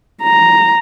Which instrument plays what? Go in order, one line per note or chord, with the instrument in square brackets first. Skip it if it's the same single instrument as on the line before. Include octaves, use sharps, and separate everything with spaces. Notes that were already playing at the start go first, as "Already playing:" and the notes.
[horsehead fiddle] A#5